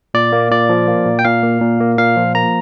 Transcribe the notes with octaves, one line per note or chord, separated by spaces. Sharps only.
A#2 D5
A#3
A#2 D5
F3
A#3
A#2
G5
A#2 F5
A#3
A#2
A#3
A#2 F5
F3
A#3 A#5